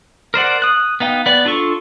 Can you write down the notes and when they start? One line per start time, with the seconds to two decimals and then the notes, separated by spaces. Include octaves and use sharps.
0.34 A#4 C5 D5 F#5
0.62 D#6 F#6
1.00 B3 D#4 F5 G5
1.26 B3 D5
1.45 D4 F4 A4 C#6